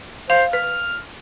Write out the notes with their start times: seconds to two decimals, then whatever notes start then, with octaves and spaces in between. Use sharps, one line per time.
0.30 C5 F5
0.53 B4 F6